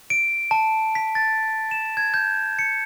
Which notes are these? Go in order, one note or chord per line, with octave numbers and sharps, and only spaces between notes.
D7
A5
B6
A6
E7
G#6
G6
C#7